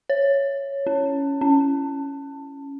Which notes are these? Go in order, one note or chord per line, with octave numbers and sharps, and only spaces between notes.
C#5
C#4
C#4